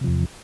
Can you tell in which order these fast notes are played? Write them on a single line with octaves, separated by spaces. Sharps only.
C3 F3 E2